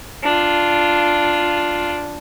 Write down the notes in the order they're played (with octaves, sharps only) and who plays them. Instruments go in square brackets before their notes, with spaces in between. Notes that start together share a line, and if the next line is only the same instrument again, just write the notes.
[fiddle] D4 F4